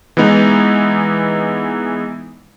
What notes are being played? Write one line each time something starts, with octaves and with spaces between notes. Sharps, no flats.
E3 G#3 B3 D#4